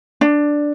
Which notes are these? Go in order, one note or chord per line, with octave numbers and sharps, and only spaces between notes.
D4